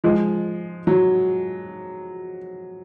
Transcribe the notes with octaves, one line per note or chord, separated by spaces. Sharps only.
F3 G#3
F#3